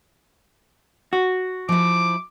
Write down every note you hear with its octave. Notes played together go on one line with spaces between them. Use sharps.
F#4
F3 E4 D6